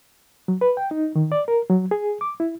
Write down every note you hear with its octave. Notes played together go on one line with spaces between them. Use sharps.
F#3
B4
G5
D#4
D#3
D5
A#4
F#3
G#4
D6
E4